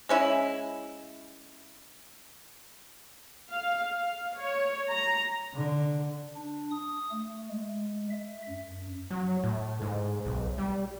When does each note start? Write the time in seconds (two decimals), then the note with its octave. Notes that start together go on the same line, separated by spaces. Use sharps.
0.09 G#3 C#4 E4
3.51 F5
3.90 F5
4.37 C#5
4.89 A#5
5.55 D3
6.36 D4
6.71 D#6
7.11 A3
7.50 G#3
8.10 E5
8.49 F#2
9.11 F#3
9.44 A2
9.82 G#2
10.26 B1
10.58 G3